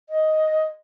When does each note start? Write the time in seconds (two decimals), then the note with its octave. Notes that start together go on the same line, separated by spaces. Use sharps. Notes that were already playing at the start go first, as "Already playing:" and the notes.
0.10 D#5